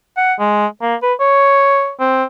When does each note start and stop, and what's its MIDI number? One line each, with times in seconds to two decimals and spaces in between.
0.17 0.34 78
0.39 0.67 56
0.82 0.95 58
1.03 1.14 71
1.20 1.92 73
2.00 2.24 60